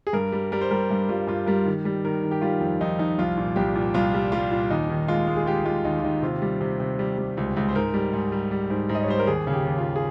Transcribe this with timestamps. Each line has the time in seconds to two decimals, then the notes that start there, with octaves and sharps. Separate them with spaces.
0.07 G#4
0.13 G2 A#4
0.32 G3
0.52 G3 A#4
0.61 C5
0.71 G3 A#4
0.90 G2
1.09 G3 F4
1.27 G2 F4
1.46 G3 A#4
1.66 D#3
1.85 G3
2.05 D#3 A#4
2.23 D#3
2.31 G4
2.42 G3 F4
2.61 F2
2.81 F2 D#4
2.99 F2 D#4
3.18 C2 F4
3.37 A#2
3.56 C2 G4
3.75 A#2
3.94 C2 F4
4.14 G3
4.32 G3 F4
4.51 A#2
4.70 D#2 D#4
4.90 D#3
5.08 G#3 F4
5.27 G#3
5.37 G#4
5.46 G#3 G4
5.65 G#3 F4
5.85 D#2 D#4
6.00 F4
6.03 D#2 D#4
6.22 C3 F4
6.42 G3
6.61 C3
6.80 C3
6.99 G3
7.18 G3
7.37 C#2
7.57 C#2
7.68 C5
7.75 G#2 A#4
7.94 G3
8.13 G#2
8.32 G3
8.51 G3
8.70 G#2
8.89 G#2
8.95 D#5
9.03 C#5
9.08 G3 C5
9.19 A#4
9.27 D#2 G#4
9.47 C#3
9.53 G4
9.65 D#2
9.78 F4
9.85 D#2
9.96 G#4